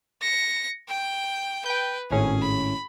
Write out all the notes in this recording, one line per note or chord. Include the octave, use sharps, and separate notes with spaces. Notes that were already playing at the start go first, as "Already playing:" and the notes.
A#6 C#7
G5 G6
B4 G5 G6
G#1 A2 C#4 G#4
B5